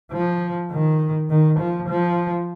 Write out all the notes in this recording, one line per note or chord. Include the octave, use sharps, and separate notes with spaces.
F3
D#3
D#3
F3
F3